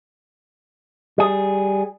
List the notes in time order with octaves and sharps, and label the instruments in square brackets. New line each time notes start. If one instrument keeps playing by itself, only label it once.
[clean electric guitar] G3 G#4